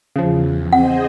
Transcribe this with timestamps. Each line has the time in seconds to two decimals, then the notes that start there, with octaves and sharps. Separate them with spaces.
0.16 E2 C#3 F3
0.73 C4 G#4 C5 D#5 F#5